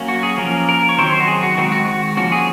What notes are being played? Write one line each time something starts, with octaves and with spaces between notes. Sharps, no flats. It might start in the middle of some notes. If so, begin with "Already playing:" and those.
Already playing: F#3 A#3 C#4
F#4
G#4
F3 A#3 C#4 A#4
A#4
C#5
D#3 F#3 C4 C5
C5
F#4
G#4
F#4
D#3 G#3 C4 F#4
F#4
F#4
F3 A#3 C#4 F#4
G#4